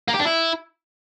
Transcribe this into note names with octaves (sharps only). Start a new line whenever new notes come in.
A#3
G4
D4
E4